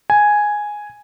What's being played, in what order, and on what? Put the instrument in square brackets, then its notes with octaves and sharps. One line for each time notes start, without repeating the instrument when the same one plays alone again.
[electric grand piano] G#5